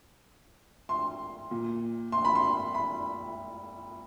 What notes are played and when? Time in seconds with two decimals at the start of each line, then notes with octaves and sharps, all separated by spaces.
0.89 C6
1.51 A#2
2.12 C6
2.25 B5
2.35 C6
2.74 B5